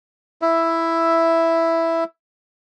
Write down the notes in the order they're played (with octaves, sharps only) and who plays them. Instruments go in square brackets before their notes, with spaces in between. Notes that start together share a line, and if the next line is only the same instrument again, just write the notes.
[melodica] E4 E5